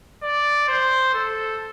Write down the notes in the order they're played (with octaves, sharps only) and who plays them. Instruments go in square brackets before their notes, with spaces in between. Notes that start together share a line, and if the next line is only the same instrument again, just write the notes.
[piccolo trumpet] D5
C5
A4